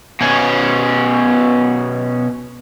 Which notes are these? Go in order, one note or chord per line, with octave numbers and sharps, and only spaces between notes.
B2 C#4